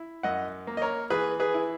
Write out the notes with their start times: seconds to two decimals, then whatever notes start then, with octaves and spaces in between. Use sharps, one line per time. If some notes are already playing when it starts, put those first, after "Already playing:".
Already playing: E4
0.23 F#2 D#5 F#5
0.67 A#3
0.77 D#5
0.82 A#4 C#5
1.10 E3 G#4 B4
1.40 G#4 B4
1.54 E4